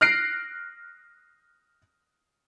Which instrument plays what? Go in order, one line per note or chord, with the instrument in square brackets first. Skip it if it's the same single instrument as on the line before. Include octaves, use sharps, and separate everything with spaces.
[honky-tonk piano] F6 F#6 A#6 C7 D7